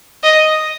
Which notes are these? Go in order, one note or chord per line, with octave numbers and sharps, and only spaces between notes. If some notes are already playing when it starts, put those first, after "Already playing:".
D#5